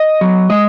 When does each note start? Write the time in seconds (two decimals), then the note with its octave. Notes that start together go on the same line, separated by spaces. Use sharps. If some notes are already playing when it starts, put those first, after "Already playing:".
Already playing: D#5
0.21 F#3
0.50 G#3 D#5